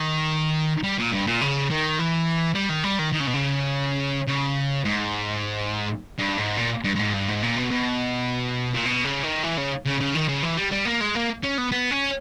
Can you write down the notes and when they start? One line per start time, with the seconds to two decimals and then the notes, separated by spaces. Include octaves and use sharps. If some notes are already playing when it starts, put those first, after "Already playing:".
Already playing: D#3
0.83 G3
0.98 A#2
1.12 G2
1.27 A#2
1.41 C#3
1.70 D#3
1.99 E3
2.55 G3
2.69 D#3
2.84 G3
2.99 D#3
3.12 D#3
3.20 C#3
3.27 B2
3.34 C#3
4.27 C#3
4.85 G#2
6.18 G2
6.37 G#2
6.57 A#2
6.84 G2
6.95 G2
6.99 G#2
7.14 G2
7.28 G#2
7.42 A#2
7.56 B2
7.71 B2
8.74 A#2
8.86 B2
9.05 C#3
9.23 D#3
9.43 E3
9.58 C#3
9.86 C#3
10.00 C#3
10.14 D#3
10.28 C#3
10.43 E3
10.57 G3
10.72 G3
10.85 A#3
11.01 G#3
11.15 A#3
11.43 C#4
11.58 B3
11.72 B3
11.91 C#4